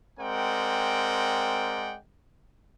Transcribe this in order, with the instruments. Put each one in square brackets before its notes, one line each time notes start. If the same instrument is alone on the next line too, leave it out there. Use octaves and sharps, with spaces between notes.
[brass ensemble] G#3 C4 A#4 D5 F#5 G5